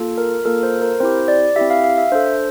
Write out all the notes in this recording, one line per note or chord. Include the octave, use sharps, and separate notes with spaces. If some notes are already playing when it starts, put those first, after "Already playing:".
Already playing: A#3 F4 A4
A#4
A#3 F4 A4 A#4
C5
A#4
C4 E4 G4 C5
D5
C4 E4 G4 E5
F5
F5
E5
D4 A4 C5